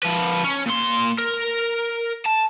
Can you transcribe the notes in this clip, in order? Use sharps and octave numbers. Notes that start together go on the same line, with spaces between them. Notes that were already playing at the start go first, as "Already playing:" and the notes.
F3 B4
C#4
A#2 C6
A#4
A5